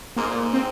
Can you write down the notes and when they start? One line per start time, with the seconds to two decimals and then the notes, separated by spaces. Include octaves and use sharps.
0.16 G#2 A#3
0.28 A#2
0.39 G#2
0.53 C4